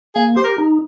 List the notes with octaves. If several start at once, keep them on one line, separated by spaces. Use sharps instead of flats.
A#3 G#4
G4 C5
A#4
D#4